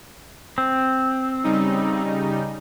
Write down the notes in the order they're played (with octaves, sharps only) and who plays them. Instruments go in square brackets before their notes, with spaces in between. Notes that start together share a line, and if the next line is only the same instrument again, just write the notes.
[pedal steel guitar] C4
[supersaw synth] C#3 G3 D#4